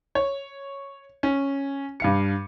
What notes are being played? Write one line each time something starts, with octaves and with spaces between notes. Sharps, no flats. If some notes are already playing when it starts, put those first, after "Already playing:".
C#5
C#4
G2 F5 C#7